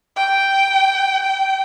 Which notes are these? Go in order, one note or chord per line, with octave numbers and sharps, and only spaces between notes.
G5
G5